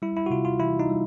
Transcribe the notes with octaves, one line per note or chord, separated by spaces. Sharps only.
G3 E4
E4
F#4
C3 F4
F4
E3 E4
D#4
G3